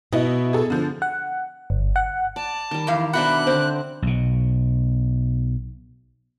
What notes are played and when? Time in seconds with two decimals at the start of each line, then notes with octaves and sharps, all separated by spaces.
0.13 B2 E4 D#5
0.53 G#4 A4
0.70 D3 F3
1.02 F#5
1.70 G1
1.96 F#5
2.36 D5 A5
2.71 D#3 G3
2.87 E2 E3 F5
3.13 B2 D4 C5 E5 F#5 B5 F#6
3.47 D3 C4 C5 D6
4.02 B1 B2